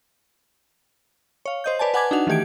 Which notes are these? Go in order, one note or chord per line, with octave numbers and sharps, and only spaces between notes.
C#5 F5
C5 D#5 G6
B4 D5 G#5 A5
B4 F#5 G#5 A5 D6 G#6
D4 D#4 F#4 F#5 F7
D#3 E3 A3 G4 G#6 D7